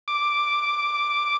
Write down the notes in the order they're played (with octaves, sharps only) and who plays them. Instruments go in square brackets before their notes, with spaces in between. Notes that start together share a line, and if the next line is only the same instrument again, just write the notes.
[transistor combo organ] D6